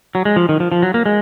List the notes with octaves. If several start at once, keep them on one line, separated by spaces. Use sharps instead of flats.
F#3
G#3
F3
D#3
F3
F3
F#3
A#3
G#3